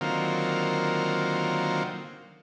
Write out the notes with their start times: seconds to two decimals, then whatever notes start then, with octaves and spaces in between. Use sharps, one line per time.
0.01 D3 D#3 F#3 A#3 C4 F4